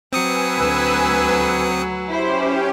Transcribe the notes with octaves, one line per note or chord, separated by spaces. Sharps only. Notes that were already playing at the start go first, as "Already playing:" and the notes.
F#3 C4 B4 G#5 D#6 E6 C#7
D2
C#4 E4 G4 C5